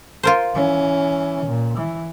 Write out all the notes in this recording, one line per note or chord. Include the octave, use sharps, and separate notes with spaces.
F4 A#4 C5
E3 C#4
A#2
E3